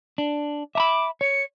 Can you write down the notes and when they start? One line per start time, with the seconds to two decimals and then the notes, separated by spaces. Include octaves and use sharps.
0.18 D4
0.75 E5 A#5 B5 D6
1.21 C#5 C#7